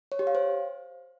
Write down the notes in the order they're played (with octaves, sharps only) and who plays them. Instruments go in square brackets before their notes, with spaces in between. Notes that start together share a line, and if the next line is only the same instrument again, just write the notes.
[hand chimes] C#5
G4
F5
C5